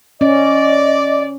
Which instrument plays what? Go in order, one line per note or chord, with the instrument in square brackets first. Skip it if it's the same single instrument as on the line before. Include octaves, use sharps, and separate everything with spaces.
[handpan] C#4 [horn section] D5 [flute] D#5